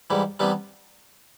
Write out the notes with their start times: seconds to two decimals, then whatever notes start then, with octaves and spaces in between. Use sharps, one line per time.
0.10 G#2 E3 G3
0.40 C3 E3 G3 B3